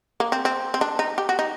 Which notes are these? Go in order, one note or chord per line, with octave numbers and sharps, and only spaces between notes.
A#3
C4
C4
C4
D4
D#4
G4
F#4
D#4